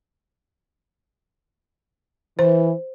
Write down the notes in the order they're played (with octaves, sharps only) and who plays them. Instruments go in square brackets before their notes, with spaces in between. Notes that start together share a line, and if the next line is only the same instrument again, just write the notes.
[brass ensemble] E3 [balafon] C5